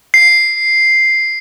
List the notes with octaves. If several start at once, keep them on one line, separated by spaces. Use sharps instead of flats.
C7